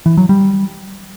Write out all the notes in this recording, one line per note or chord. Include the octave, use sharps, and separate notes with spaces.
E3
F#3
G3